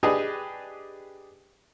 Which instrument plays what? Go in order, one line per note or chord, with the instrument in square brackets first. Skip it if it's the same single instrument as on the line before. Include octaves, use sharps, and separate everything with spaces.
[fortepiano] D4 G4 G#4 B4 D#5